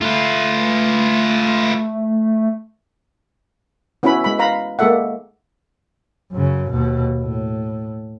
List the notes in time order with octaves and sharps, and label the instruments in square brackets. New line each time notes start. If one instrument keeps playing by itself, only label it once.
[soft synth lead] A3 [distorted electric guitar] F4 B4
[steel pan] B3 C#4 E4 F#4 B4 B5
G#3 B5
B4 F5 A#5 B5
G#3 A#3 G#4 A4 E5 F#5
[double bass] F#2 C#3
D#2 B2
A2